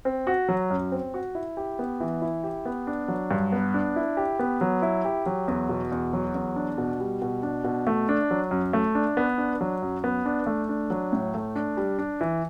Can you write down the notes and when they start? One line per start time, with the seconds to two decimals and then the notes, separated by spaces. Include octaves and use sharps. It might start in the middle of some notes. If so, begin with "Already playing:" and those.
0.05 C4
0.27 F#4
0.49 F#3
0.70 F#2
0.92 C4
1.14 F#4
1.35 E4
1.57 G4
1.79 B3
2.00 E3
2.22 E4
2.44 G4
2.65 B3
2.87 D4
3.08 F#3
3.31 G2
3.52 B3
3.74 D4
3.96 E4
4.17 G4
4.39 B3
4.61 F#3
4.82 E4
5.05 G4
5.26 F#3
5.48 E2
5.69 B2
5.92 E2
6.13 F#3
6.35 E2
6.56 D4
6.78 B2
7.00 G3
7.22 B2
7.43 D4
7.64 B2
7.87 A3
8.09 D4
8.31 F#3
8.51 F#2
8.73 A3
8.95 D4
9.17 B3
9.38 D4
9.61 F#3
9.82 F#2
10.04 B3
10.26 D4
10.47 A3
10.69 D4
10.90 F#3
11.13 A2
11.34 A3
11.56 D4
11.77 G3
11.99 D4
12.21 E3